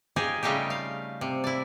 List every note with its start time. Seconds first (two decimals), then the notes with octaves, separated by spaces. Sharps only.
0.16 D#4 F4 G4 G#4
0.43 C#3 G3 A3 D#4 F4 G4
0.70 F5
1.21 C3
1.44 E4 D5